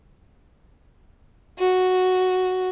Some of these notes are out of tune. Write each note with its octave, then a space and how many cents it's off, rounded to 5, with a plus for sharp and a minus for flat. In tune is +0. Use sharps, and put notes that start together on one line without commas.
F#4 -5